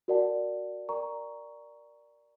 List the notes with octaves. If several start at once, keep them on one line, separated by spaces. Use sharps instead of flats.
F#4 A#4 D5 F#5 A5
A#4 D5 G5 A#5 C#6